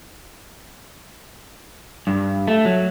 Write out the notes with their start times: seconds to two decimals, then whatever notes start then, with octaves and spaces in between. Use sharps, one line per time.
2.07 G2
2.48 A3
2.65 F#3